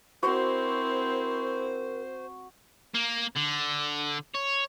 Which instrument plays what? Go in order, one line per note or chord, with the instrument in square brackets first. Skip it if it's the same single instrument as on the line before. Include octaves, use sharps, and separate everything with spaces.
[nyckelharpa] C4 E4 [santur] F#4 [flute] A#4 [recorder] C5
[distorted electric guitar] A#3
D3
C#5